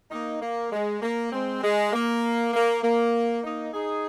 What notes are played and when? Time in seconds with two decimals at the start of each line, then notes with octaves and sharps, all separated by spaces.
0.11 A#3 D#4
0.41 A#3
0.72 G#3
1.02 A#3
1.32 G#3 C4
1.63 G#3
1.93 A#3
2.54 A#3
2.83 A#3
3.43 A#3 D#4
3.73 D#4 G#4